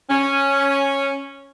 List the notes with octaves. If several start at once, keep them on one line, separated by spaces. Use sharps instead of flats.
C#4